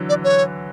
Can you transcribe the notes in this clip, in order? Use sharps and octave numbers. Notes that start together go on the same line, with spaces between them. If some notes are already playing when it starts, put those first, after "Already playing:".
Already playing: D3 E3 F#3
D5
C#5